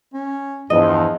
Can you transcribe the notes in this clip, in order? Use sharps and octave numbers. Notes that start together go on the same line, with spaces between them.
C#4
E2 G2 F3 D#5